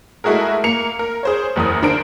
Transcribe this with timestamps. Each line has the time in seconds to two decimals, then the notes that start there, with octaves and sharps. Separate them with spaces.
0.24 G#3 A3 E4 F#4 G#4 A#4
0.64 A#3 C#7 F7
0.99 A#4
1.23 G#4 C5 C#5
1.56 F#1 E2 A#4 D#6
1.82 D3 D4 A#4 C5 D7